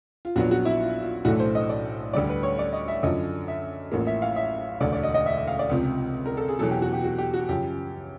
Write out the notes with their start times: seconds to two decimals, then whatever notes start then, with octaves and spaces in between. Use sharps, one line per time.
0.25 F4
0.36 A#1 A#2 F#3 B3 D4 F#4
0.51 F#4
0.65 E4
0.81 F4
1.03 F4
1.25 B1 A2 E3 A3 D4 F#4
1.40 C5
1.55 D#5
1.69 D5
2.13 D2 D3 G3 D5
2.29 B4
2.43 C#5
2.59 D5
2.73 D#5
2.88 E5
3.03 F#2 D3 F3 D#5
3.48 E5
3.92 A1 A2 F3 A#3
4.07 E5
4.22 F5
4.36 E5
4.81 E1 D2 D3 D5
4.93 D5
5.03 D#5
5.14 D#5
5.26 E5
5.37 E5
5.48 F5
5.59 D5
5.70 C#2 C3 F3
6.26 A#4
6.37 A4
6.48 G#4
6.59 E2 B2 F#3 A4
6.71 G4
6.82 F#4
6.93 G4
7.04 F#4
7.18 G4
7.34 F#4
7.49 F#2 C#3 F3 G4